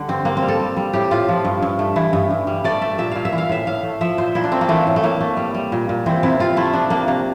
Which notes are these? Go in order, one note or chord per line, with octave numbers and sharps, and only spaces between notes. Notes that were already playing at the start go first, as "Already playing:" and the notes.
Already playing: D3 G3
G2 C4
G2 A#3
C4
G3
A4
G3
G3
A2 G4
A2 F4
F3
G2
G2
A3
E3 E4
G2
G2
G3
A3 D5
A3 E5
A#2 E5
A#2 F5
E5
E3
F5
A2 E5
A2 F5
A3
F3 E5
A#2 C5
A#2 E4
D4
A3 C4
A#3
E3 A3
A2
A3
A2 A#3
A3
G3
G3
A#2
A#2
E3 C4
C3 E4
C3 F4
A3 E4
F3 D4
C3 A#3
C3 A#3